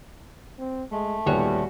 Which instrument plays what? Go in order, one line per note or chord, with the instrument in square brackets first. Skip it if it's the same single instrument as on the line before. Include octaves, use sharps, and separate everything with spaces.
[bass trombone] C4
[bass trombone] G#3 [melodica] A3
[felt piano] D#2 A#2 B3 [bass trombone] G3 [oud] F#4 G#4 C#5